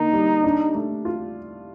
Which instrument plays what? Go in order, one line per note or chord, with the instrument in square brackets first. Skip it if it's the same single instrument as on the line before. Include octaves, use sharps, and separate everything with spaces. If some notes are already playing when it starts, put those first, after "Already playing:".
Already playing: [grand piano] D3 A#3 [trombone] D#4
[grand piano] G3
D4
A3
F4